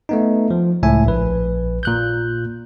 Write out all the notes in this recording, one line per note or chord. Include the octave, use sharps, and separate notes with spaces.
A3 B3 D#4
F3
C#2 A2 E5 G#5
A#1 B4
A#2 F#6 G6